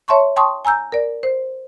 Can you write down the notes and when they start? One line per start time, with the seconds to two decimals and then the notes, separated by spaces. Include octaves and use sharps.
0.08 C#5 E5 A5 C6 C#6
0.36 G5 A5 C6 C#6 D#6
0.65 G#5 A#5 E6 G6
0.92 A#4 D5
1.23 C5